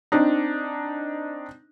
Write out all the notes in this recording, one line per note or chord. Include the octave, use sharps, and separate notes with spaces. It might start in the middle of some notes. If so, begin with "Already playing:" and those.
C4 D4 D#4